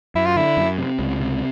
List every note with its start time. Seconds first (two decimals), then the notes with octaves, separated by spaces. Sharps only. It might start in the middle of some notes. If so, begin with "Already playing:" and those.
0.15 F#2 E4
0.26 F4
0.36 D3 E4
0.57 F#2
0.78 C3
0.99 C#2
1.20 C3